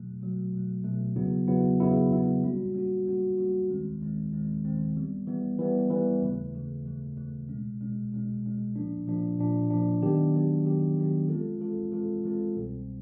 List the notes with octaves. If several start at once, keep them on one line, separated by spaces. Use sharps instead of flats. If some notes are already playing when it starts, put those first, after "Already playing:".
Already playing: B2 F#3 A3
B2 F#3 A3
B2 F#3 A3
B2 F#3 A3
E2 C#3 F#3 B3 E4
E2 C#3 F#3 B3 E4
E2 C#3 F#3 B3 E4
E2 C#3 F#3 B3 E4
G3 A#3 C#4 F#4
G3 A#3 C#4 F#4
G3 A#3 C#4 F#4
G3 A#3 C#4 F#4
D#2 D#3 G#3 C4
D#2 D#3 G#3 C4
D#2 D#3 G#3 C4
D#2 D#3 G#3 C4
E3 G3 B3
E3 G3 B3
E3 G3 B3
E3 G3 B3
D#2 C#3 E3 A3
D#2 C#3 E3 A3
D#2 C#3 E3 A3
D#2 C#3 E3 A3
B2 G#3 C#4
B2 G#3 C#4
B2 G#3 C#4
B2 G#3 C#4
A#2 F3 A#3 D4
A#2 F3 A#3 D4
A#2 F3 A#3 D4
A#2 F3 A#3 D4
D#3 F#3 B3 D4 G4
D#3 F#3 B3 D4 G4
D#3 F#3 B3 D4 G4
D#3 F#3 B3 D4 G4
E3 G#3 C4 F4 A4
E3 G#3 C4 F4 A4
E3 G#3 C4 F4 A4
E3 G#3 C4 F4 A4
C2 B2 G3 C4